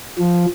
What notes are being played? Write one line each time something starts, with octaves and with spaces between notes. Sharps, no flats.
F3